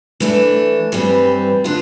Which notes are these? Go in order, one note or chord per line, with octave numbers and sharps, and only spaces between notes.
E3 A3 D4
G2 E3 G3 C4
D3 B3 D4 F4